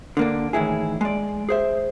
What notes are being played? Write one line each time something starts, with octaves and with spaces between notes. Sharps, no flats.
D3 A#3 D4
A2 D#3 E3 E4 G#4
G#3 D5
G#4 C5 E5